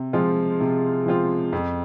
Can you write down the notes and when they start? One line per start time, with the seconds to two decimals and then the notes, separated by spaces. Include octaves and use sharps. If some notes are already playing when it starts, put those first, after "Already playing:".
Already playing: C3
0.13 F3 G#3 C4 F4
0.60 C3
1.06 F3 G#3 C4 F4
1.53 F2